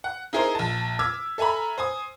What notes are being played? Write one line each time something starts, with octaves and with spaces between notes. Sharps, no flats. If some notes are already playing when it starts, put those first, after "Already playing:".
F#5
D#4 E4 G#4 A#4 C5
A#1 A5
D6 E6 F6 G#6 B6
A4 E5 G#5 A#5 B5
C5 G#5 D#6